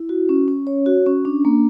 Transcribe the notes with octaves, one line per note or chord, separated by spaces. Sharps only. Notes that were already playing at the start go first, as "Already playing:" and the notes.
Already playing: E4
F#4
C#4
C#4
C#5
F#4
C#4
D4
A#3